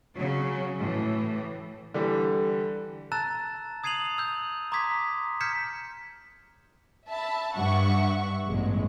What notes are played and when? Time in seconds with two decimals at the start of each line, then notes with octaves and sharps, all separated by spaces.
0.15 C#3 F#3
0.78 A2 E3
1.94 D3 E3 G3
3.12 A5 A#5 E6 F#6 A6 E7
3.84 D#6 G#6 C7 D#7 F7 F#7
4.18 E6 G6
4.72 A#5 C6 D6 D#6 G#6 B6
5.41 F6 G6 G#6 B6 C#7 E7
7.08 E5 A5 B5
7.55 G2 E5 F#5 C#6
8.47 A1 E2 G2 F#3 G#3